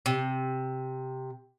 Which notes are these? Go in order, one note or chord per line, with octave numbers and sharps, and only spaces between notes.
C3